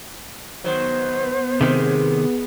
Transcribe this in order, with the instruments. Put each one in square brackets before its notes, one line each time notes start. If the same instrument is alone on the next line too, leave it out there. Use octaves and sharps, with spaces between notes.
[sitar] D#3 F#3 [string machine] B3 [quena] C5
[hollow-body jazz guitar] C3 D#3 [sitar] G#3